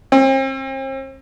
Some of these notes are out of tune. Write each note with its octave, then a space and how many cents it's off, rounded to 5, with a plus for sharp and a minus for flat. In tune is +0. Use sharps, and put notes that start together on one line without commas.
C4 +40